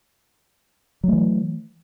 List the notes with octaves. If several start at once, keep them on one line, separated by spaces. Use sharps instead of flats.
E3 F#3 A3